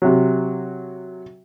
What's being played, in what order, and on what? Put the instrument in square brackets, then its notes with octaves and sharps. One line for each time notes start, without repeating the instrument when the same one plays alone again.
[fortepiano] C3 F#3